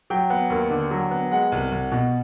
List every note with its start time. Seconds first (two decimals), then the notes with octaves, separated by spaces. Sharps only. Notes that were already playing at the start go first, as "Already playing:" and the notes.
0.10 F#3 G5
0.30 B3
0.50 D#2
0.70 D3
0.91 F#3
1.11 B3
1.31 G#3 F#5
1.52 C2
1.72 C2
1.92 B2